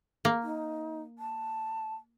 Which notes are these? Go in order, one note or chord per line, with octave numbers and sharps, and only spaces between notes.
A#3
D#4
A5